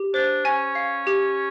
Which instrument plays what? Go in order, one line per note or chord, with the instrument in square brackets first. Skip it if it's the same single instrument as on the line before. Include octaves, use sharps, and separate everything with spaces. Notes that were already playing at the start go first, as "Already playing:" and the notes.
Already playing: [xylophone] G4
[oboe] D4 [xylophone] C5
[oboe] C#4 [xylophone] G#5
[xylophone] F5
G4